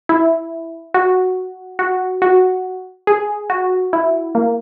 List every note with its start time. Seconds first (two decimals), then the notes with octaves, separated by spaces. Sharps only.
0.09 E4
0.94 F#4
1.79 F#4
2.22 F#4
3.07 G#4
3.50 F#4
3.93 E4
4.35 A#3